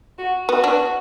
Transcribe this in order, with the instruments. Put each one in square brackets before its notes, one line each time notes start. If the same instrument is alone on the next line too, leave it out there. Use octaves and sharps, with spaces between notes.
[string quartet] F#4
[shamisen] B3 [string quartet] F#4
[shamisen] B3 D4